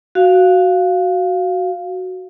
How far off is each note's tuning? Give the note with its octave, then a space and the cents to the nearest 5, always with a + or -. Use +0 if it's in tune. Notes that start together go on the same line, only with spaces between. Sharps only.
F#4 +0 F5 +0